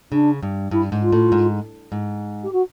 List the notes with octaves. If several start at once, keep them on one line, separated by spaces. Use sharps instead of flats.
C#3 D4
G2
G2 E4
G#2
F4
A2
G#2
G#2
G4
F#4